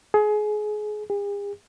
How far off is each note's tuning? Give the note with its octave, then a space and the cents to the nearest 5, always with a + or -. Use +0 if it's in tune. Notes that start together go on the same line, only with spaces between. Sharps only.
G#4 +25
G#4 -45